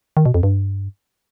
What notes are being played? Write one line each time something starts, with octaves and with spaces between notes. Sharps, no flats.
D#3
B2
F2
G2